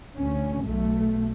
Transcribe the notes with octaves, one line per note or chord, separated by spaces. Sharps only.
D2 C#4
B1 A3